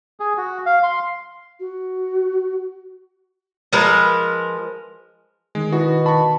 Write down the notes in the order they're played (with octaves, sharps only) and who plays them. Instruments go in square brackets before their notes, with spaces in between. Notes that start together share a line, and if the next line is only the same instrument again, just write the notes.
[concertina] G#4
F#4
F5
C6
[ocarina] F#4
[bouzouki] F3 G#3 A#4 B4
[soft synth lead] D#3 [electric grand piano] G#3
[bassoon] B2 [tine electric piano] E4 [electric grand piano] F#4
[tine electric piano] A5 [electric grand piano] B5 C#6